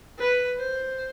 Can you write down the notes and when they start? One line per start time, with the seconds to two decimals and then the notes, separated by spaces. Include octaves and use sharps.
0.19 B4
0.59 C5